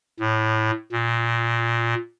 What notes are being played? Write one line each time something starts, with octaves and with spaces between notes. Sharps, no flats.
A2
A#2